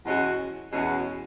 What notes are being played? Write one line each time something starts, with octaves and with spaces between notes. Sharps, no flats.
E2 B2 G#3 C#4 F#4
E2 B2 G#3 C#4 F#4